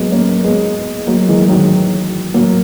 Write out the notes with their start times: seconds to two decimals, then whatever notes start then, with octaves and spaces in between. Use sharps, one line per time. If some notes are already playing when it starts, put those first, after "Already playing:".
Already playing: F#3 G#3 A#3 B3
0.12 A#3 C#4
0.44 G#3 B3
1.07 F#3 A#3
1.28 E3 G#3
1.45 G#3
1.49 D#3 F#3
2.34 F#3 A#3